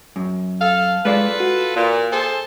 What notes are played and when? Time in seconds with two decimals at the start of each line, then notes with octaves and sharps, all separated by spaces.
0.16 F#2
0.60 A4 F5
1.05 G#3 F4 A4 B4 D5 F5
1.40 F#4
1.76 A#2
2.12 G#4 A4 C5